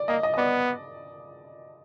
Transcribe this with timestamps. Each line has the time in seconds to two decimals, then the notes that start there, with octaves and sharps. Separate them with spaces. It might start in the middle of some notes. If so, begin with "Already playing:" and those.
Already playing: D5
0.08 A#3 D#5
0.23 D#5
0.34 D#5
0.38 B3 D5